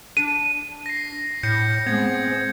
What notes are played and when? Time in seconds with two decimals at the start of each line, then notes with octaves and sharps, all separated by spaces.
0.17 D4 D#7
0.86 A#6 C7
1.43 A2 G6 A#6 C#7
1.86 G#3 B3 C4 G#6